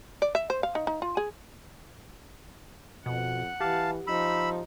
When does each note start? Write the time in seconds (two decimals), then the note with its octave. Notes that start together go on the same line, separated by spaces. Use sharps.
0.22 D5
0.35 E5
0.50 C5
0.63 F5
0.75 D#4
0.87 D#4
1.02 F4
1.17 G#4
3.06 F2 B2 F#5
3.60 E3 G4 F5 A5
4.07 F3 D#4 B5 E6